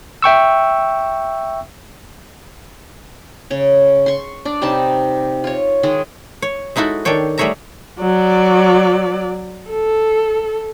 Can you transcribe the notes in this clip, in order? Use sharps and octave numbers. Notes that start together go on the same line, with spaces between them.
E5 G5 C#6 E6
C#3 C#5
C6 C#6
D4 D5
C3 G3 D#4 A5
F4 C#5
D#3 G#3 G#4
C#5
G#3 D#4 E4 F#4 A4
D#3 D4 A4 C#5 G5
G3 A3 G#4 C#5 E5 A#5
F#3 D5
A4